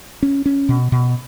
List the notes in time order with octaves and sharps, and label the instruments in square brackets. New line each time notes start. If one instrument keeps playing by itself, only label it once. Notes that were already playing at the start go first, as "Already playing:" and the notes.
[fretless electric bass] C#4
C#4
B2
B2